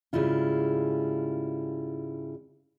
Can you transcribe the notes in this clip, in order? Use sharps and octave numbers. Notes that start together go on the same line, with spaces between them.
G#2 C#3 G3 E4 F4